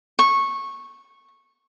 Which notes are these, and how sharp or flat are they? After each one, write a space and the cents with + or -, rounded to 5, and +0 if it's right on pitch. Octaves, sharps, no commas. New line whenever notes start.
C#6 -15